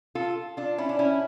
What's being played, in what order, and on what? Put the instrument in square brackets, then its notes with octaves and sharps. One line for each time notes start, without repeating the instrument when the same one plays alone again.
[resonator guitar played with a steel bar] F4 A4
D4 F4
C#4 E4
D4
C#4 E4